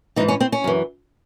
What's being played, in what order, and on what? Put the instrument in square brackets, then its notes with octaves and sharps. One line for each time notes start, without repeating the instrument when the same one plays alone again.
[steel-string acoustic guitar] G#2 E3 D#4
C#4
C4
C#4
F#2 E3